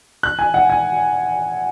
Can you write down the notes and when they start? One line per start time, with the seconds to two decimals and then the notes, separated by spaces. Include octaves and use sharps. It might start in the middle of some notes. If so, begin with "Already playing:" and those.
0.23 F#6
0.39 G#5
0.54 F#5
0.70 G#5